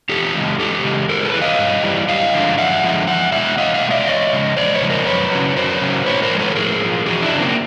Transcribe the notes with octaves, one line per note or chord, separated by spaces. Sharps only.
E2 G4 A4
C#3 E3 G#3
E2 G4 A4
C#3 E3 G#3
G2 G#4 A#4
C5
A4 B4
E3 G3
D#5 F5
G2
E3 G3
F#2 D#5 F5
D3 F3 G#3
F#2 E5 F#5
D3 F3 G#3
E2 E5 F#5
B2 G#3 E5 F#5
E2 D#5 F5
D#5 F5
B2
G#3 D5 E5
E2 C#5 D#5
C#3 F3 G#3
E2 C5 D5
B4 C#5
C#3 F3 G#3
A#4 C5
F#2 B4 C#5
C#3 F#3
F#2 A#4 C5
C#3 F#3
A2 B4 C#5
A#4 C5
F3 G#3
A4 B4
A2 G#4 A#4
G#3
F3
E2 F#4 G#4
D4 E4
C#3 F#3
A#3 C4